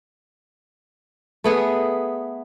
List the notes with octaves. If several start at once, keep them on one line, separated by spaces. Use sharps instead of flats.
A3 B3 G#4